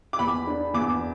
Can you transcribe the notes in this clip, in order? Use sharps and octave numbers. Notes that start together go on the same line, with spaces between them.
D6
E2 B5
D4
E2 D6